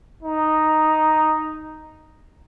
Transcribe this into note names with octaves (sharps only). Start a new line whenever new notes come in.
D#4